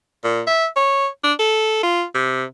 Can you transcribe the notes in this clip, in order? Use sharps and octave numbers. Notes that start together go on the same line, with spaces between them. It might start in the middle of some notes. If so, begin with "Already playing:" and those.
A#2
E5
C#5
D4
A4
F4
C3